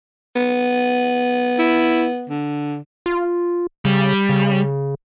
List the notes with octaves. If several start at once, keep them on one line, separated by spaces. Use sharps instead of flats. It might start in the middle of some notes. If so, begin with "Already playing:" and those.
B3
E4
D3
F4
C#3 G3
C#3